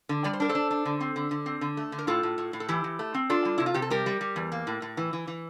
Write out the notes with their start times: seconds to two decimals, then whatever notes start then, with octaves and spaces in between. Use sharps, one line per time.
0.09 D3
0.24 G3 D5
0.33 C5
0.40 D4 A#4
0.49 A4 C5
0.55 D4
0.71 D4
0.85 D3
1.01 C4
1.16 D3
1.31 D3
1.46 C4
1.61 D3
1.77 A3
1.92 D3
1.99 A#4
2.07 A2 F4 A4
2.23 A2
2.38 A2
2.53 A2
2.60 A4
2.69 E3 E4 G4
2.84 E3
2.99 A3
3.14 C4
3.30 D4 F4 A4
3.45 G3
3.58 C3 E4
3.66 F4
3.74 C3 G4
3.82 A4
3.90 G3 G4 A#4
4.06 G3
4.21 G3
4.36 E2
4.52 A#3
4.67 A2
4.82 A2
4.97 E3
5.13 E3
5.28 E3